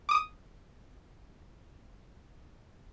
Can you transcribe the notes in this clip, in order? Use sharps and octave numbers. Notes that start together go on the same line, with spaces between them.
D6 D#6